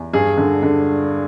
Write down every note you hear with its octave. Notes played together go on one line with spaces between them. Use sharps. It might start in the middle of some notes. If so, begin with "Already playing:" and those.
Already playing: E2
G2 G#4
D3
D3